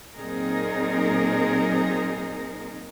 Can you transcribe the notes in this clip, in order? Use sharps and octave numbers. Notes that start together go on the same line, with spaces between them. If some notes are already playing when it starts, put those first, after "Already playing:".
A#2 F#3 C4 D#4 G#4 A#4